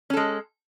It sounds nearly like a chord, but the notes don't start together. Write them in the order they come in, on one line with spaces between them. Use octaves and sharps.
C#4 A4 G#3